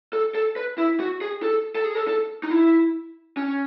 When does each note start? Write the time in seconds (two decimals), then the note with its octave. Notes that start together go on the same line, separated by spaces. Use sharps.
0.13 A4
0.35 A4
0.56 B4
0.78 E4
1.00 F#4
1.21 G#4
1.43 A4
1.75 A4
1.85 G#4
1.95 A4
2.07 A4
2.43 D#4
2.50 E4
3.37 C#4